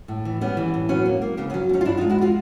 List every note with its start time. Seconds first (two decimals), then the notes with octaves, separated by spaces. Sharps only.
0.08 A2
0.25 E3
0.41 G3 B3 C#4
0.57 E3
0.74 A2
0.89 F#3 B3 C#4
1.06 A#3
1.22 A#3
1.37 C#3 B3
1.50 B3 C#4
1.54 F#3
1.69 D2 C#4 D#4
1.81 F4
1.85 G2 D4 E4
1.97 D#4 F4
2.01 G#3
2.09 E4 F#4
2.19 G#3 F4 G4